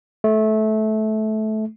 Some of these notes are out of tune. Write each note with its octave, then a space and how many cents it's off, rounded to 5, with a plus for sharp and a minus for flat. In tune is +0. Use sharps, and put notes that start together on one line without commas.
A3 -20